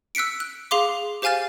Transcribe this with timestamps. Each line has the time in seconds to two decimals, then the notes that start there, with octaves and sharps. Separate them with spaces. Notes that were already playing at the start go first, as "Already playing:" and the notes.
0.15 E6 F#6 B6 C#7 D7
0.40 F#6
0.71 G#4 F5 C6 D6
1.22 G4 C5 F5 G#5 F6 A6